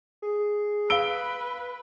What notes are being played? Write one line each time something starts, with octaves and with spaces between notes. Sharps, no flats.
G#4
B4 F5 E6 D7 G7